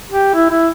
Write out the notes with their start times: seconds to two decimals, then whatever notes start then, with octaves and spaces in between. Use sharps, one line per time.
0.08 G4
0.34 E4
0.50 E4